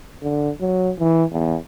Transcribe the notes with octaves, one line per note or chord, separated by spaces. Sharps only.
D3
F#3
E3
E2